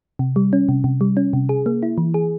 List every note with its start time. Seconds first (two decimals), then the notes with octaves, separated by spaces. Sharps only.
0.19 C3
0.36 G3
0.53 C#4
0.69 C3
0.84 C3
1.01 G3
1.17 C#4
1.33 C3
1.49 G#4
1.66 A#3
1.83 E4
1.98 E3
2.14 G#4